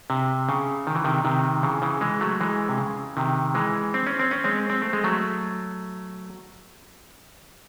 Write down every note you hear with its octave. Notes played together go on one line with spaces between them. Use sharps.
C3
C#3
D#3
E3
C3 D#3
C3 D#3
C#3 E3
C#3 E3
E3 G#3
F#3 A3
E3 G#3
C3
C#3
C3 D#3
E3 G#3
C4
C#4
C4
C#4
G#3 C4
C4
A3
G#3
F#3 A3